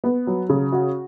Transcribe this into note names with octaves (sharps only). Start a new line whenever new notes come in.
B3
F#3
C#3
F#4